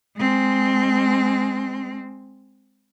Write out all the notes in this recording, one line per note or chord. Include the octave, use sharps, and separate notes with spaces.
G#3 C4